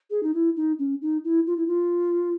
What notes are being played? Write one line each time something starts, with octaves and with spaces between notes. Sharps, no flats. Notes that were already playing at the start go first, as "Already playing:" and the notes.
G#4
D#4
E4
D#4
C#4
D#4
E4
F4
E4
F4